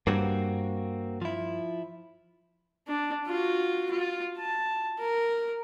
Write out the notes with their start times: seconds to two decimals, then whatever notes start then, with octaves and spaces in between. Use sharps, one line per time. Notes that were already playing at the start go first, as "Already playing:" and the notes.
0.07 G2 A#3 C4 F#4
1.22 F3 E4
2.88 D4
3.27 F4 F#4
3.91 F4
4.39 A5
5.00 A#4